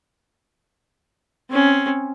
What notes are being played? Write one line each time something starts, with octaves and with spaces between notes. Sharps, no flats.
C4 C#4